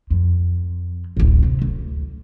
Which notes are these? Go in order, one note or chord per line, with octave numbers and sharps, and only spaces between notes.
F2
D1 A1
C3
D2